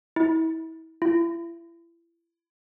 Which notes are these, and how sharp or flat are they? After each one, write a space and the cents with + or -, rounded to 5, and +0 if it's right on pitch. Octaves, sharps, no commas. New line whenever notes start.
E4 -30
E4 +35